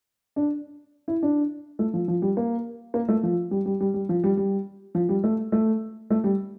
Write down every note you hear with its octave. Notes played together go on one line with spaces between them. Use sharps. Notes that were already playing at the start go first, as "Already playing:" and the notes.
D4
E4
D4
A3
F3
F3
G3
A#3
A#3
A3
F3
G3
G3
G3
G3
F3
G3
G3
F3
G3
A3
A3
A3
G3